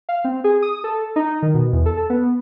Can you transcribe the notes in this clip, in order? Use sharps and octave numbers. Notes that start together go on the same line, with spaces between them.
F5
C4
G#4
D#6
A4
D#4
D#3
B2
E2
A4
A4
B3